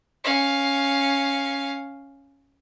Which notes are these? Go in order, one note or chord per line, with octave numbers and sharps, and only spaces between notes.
C#4 F5